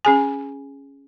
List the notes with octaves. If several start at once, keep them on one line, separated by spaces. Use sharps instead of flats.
C#4 G#4 G#5